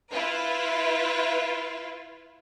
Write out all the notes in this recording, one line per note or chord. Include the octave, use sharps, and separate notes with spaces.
E4 F4 B4